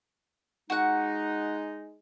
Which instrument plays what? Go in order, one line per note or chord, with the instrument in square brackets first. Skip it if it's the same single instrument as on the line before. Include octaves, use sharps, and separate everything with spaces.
[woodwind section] G#3 D#4 [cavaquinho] F#4 F#5